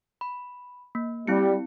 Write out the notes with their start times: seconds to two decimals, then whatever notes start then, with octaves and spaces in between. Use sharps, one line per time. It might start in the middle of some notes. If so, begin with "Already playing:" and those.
0.21 B5
0.95 A#3
1.27 G3 C4 E4 C#7